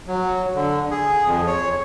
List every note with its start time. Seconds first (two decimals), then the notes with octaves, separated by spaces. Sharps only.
0.08 F#3
0.55 D3
0.91 G#4
1.27 F2
1.47 C#5